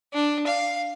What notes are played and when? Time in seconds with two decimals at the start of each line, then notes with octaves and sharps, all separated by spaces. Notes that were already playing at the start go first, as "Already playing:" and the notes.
0.13 D4
0.47 F5